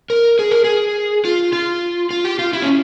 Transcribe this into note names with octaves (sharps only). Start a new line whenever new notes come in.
A#4
G#4
A#4
G#4
F4
F4
F4
G4
F4
E4
C#4